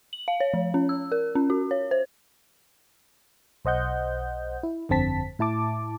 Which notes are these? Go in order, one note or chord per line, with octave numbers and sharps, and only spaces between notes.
F#7
F5
C#5
F3
C#4
E6
A#4
C#4
F#4
C#5
C5
B1 C5 D#5 F#5 G6
E4
G1 F2 D3 C4 A5 B6
A2 E4 A5 D6